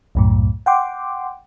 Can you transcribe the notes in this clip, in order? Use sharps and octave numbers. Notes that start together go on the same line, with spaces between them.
C2 F#2 A2
F#5 G5 C6 D6